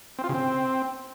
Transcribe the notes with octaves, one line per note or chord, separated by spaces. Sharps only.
C4
F4
C#3
C4